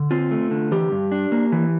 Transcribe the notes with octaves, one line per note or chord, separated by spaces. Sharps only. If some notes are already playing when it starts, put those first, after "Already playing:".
Already playing: D3
C4 F4
A3
D3
E3 G4
G2
D4
A#3
E3